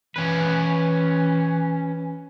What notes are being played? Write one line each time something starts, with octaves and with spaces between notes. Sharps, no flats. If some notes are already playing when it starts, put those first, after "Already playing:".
E3 C#4 B4